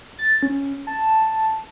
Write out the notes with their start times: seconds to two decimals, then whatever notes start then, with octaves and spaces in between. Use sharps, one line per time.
0.18 A6
0.43 C#4
0.87 A5